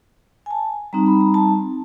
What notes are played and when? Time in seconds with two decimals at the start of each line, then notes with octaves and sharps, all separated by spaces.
0.46 G#5
0.51 A5
0.93 G3 C4 D#4 A#5
1.07 B5
1.21 A#5
1.34 A5